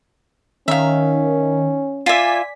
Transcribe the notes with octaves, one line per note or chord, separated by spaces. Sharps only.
D#3 C#4 E5 F5
F4 D5 E5 G#5 B6